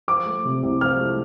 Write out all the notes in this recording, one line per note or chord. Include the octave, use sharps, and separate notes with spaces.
F3 D6
A3
C3
C2
F3 F6
A3